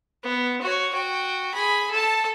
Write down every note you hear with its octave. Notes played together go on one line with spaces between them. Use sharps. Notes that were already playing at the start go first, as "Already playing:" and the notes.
B3
F#4 C#5
F#4 G5
G#4 B5
A4 A5